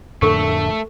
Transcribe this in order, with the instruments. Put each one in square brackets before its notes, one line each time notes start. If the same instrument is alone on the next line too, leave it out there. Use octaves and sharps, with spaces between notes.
[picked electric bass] F2 A2 D3 [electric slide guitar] A3 [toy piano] A4 A#4 C#6